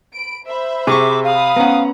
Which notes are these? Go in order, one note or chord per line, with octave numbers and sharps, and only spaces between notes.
B5 D7
C5 E5 B5
C3 G#4 C#6 D6
F5 B5 D#6
B3 C#4 F#5 A#5